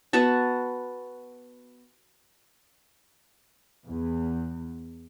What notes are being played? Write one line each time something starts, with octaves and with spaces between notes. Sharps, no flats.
B3 F#4 F#5 A5
E2